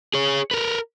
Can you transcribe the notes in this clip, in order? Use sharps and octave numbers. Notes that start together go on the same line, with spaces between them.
G#4 C#5
A#4 B4